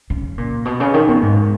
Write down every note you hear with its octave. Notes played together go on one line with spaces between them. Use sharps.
C#3
A#2
B2
C#3
D#3
B2
G#2